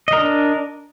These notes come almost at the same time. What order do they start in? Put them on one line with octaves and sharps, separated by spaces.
D#5 A#4 D4